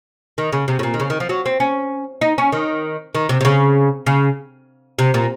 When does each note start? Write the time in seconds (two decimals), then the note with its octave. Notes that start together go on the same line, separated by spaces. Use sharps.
0.38 D#3
0.52 C#3
0.68 C3
0.79 A2
0.83 A#2
0.94 D#3
1.00 C#3
1.10 D#3
1.20 F3
1.29 F#3
1.46 C4
1.60 C#4
2.21 D#4
2.38 C#4
2.52 D#3
3.15 D#3
3.29 C3
3.41 C3
3.45 C#3
4.06 C#3
4.99 C3
5.14 A#2